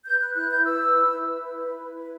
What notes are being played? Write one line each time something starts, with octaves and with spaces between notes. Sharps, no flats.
B4 G6
B4 F#6
E4 F#6
E4 G6
B4 E6
B4
E4
E4
B4
E4
B4
E4
E4
B4